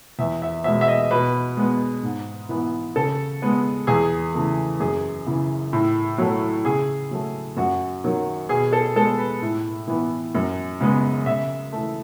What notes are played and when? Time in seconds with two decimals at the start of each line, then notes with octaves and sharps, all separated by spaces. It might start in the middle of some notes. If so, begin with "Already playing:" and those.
0.19 E2 E5
0.42 E5
0.64 B2 G#3 E5
0.81 E5
0.88 D#5
1.11 B2 B4
1.57 G#3 B3
2.03 G#2
2.49 E3 B3
2.96 C#3 A4
3.42 G#3 B3
3.87 E2 G#4
4.34 C#3 E3 A3
4.80 F#2 G#4
5.27 C#3 E3
5.73 A2
6.18 F#3 A3
6.65 C#3 G#4
7.11 F#3 A3
7.57 F#2 F#4
8.04 D#3 F#3
8.49 B2 G#4
8.73 A4
8.96 G#3 B3 A4
9.18 B4
9.42 A2
9.88 E3 B3
10.35 F#2
10.80 C#3 G#3 B3
11.26 C#3 E5
11.72 E3 A3